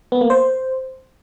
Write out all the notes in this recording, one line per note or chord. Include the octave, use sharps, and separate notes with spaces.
B3
A#3
C5